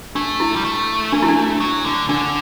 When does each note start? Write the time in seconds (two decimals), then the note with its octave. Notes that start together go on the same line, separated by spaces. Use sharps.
0.15 A3 D4
0.40 E4
0.56 G3
0.65 A3
1.13 D4
1.22 E4
1.29 D4
1.60 F#3
1.85 D3
2.09 D3 D4